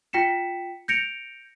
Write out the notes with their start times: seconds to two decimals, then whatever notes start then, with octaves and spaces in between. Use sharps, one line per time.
0.13 F4 G5 B6 C#7 E7
0.88 G6 A#6 C#7 D7 F7